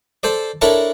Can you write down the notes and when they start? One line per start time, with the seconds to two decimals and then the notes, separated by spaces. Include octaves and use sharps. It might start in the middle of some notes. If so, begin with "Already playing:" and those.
0.23 A4 C5 D5
0.61 D4 E4 A4 A#4 C#5 A#5